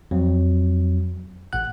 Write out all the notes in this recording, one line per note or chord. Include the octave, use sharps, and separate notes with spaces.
F2 F#3
A1 A2 F#5 F#6